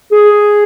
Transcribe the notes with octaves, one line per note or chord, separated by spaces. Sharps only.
G#4